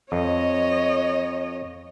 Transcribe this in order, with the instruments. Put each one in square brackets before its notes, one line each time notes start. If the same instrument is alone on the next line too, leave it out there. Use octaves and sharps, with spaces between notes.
[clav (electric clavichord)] F2 [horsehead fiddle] C#5 D#5